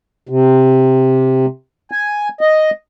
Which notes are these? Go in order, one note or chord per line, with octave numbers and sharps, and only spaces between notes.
C3
G#5
D#5